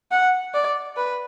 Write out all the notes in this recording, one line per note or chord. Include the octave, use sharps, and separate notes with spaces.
F#5
D5
B4